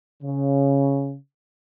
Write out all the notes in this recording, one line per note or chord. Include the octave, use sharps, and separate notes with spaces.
C#3